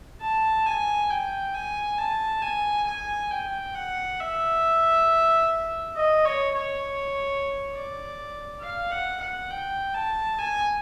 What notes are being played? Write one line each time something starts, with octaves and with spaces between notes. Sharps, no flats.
A5
G#5
G5
G#5
A5
G#5
G#5
G5
F#5
E5
D#5
C#5
C#5
D5
F5
F#5
F#5
G5
A5
G#5